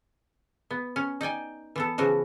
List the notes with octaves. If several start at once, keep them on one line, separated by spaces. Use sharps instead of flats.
B3
C#4
D#4 D5 G5 G#5
E3 B3 A4
C#3 E3 F3 F#4